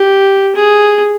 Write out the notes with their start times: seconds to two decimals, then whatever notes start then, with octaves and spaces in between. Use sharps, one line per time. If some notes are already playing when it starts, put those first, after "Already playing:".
Already playing: G4
0.55 G#4